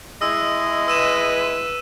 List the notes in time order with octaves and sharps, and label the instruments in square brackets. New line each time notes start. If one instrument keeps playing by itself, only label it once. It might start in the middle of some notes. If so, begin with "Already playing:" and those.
[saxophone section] G#3 E4 [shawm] D#5 [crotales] E6
[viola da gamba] B4 [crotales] E6 D#7 E7